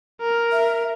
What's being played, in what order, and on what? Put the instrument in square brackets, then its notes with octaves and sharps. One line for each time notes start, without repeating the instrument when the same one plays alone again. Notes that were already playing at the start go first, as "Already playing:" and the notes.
[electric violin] A#4
[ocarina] E5